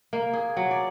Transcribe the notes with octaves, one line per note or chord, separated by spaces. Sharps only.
A#3
G#4
F#3
D5